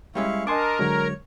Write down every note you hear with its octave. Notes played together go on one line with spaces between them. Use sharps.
G3 G#3 C#4 E4 F5 C#6
D4 A#4 D#5 G#5 A5 C6 D6 D#6
D3 F#3 G#3 C#5